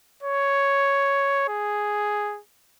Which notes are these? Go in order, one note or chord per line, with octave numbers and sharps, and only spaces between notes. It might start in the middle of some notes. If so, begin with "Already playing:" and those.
C#5
G#4